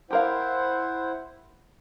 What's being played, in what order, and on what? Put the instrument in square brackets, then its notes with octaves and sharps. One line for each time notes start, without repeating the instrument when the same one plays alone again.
[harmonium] E4 C5 F#5 [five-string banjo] G4 A#4 F5